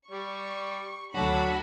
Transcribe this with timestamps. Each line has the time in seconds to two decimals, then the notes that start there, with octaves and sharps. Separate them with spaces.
0.11 G3 D5 C#6
1.15 D2 F#3 A3 D4 F#4 C#5 A5 B5